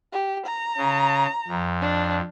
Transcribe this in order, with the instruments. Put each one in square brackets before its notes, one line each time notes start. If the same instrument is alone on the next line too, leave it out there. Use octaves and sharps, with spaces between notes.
[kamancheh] G4
A#5
[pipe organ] C#3
F2
[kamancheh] D4